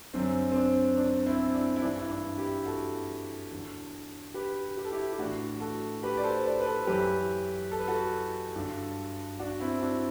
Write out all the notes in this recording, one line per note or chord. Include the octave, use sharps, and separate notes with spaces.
F#2 D3 C4
C4
D4
D4
C4 E4
D4
E4
G2 E3 D4
E4
D4
E4 G4
F#4 A4
E2 D3
G4 B4
G4
A4
E4 G4
G4
A2 E3 D4 F#4
F#4 A4
G4 B4
D5
A4 C5
B4 D5
B4
A4 C5
F#2 E3 G4 B4
A4
B4
F#4 A4
G2 D3
D4 F#4
C4 E4
D4 F#4